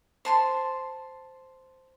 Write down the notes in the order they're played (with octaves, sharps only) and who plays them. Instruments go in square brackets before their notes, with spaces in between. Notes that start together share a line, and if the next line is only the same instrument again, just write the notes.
[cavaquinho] C5 A5 C6